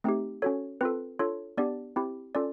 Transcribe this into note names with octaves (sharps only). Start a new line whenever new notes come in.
A3 C4 D#4 G4
C#4 F#4 A4 C#5
C4 F4 A4 B4
D4 F4 A4 C#5
B3 D4 G4 D5
C4 E4 G4
C#4 F4 A4 D5